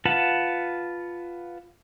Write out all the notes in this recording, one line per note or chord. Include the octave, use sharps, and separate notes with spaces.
F4 B4 F#5 A5